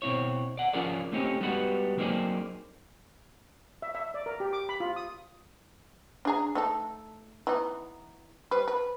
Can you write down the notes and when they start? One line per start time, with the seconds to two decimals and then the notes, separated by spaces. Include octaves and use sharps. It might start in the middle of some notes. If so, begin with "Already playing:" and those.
0.02 B2 C4 E4 C#5
0.57 D5 F#5
0.73 F3 C#4 F4 G#4 A#4 D5
1.12 A3 C4 C#4 D#4 G4
1.41 G3 G#3 B3 D#4 F#4 B4
1.98 F#3 A#3 C4 D#4 G#4 D5
3.82 E5
3.95 E5
4.14 D5
4.26 A#4
4.40 G4
4.53 D6
4.69 B5
4.80 F4
4.96 D#6
6.25 D4 G#4 A#5
6.55 A3 D#4 A4
7.47 E3 B3 D#4
8.51 G3 B4 C5
8.68 B4